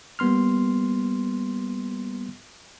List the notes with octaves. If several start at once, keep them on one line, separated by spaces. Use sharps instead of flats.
G3 A#3 B3 C6 F6